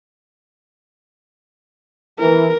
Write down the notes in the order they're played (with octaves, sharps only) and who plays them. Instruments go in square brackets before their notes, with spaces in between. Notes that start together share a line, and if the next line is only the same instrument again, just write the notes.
[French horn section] E3 [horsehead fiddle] A#4